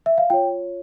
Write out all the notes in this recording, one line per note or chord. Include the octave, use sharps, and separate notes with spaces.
E5
F5
F4 C#5 G5